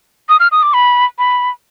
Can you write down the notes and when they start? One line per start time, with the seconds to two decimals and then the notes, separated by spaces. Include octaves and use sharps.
0.29 D#6
0.40 F6
0.52 D#6
0.63 D6
0.74 B5
1.19 B5